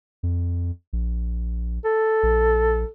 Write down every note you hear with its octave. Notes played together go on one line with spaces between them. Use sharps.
F2
A#1
A4
A#1